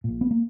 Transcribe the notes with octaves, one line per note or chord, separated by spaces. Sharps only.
A#1 A#2
B3
A#3